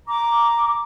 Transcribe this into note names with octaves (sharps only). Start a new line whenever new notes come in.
A#5 D6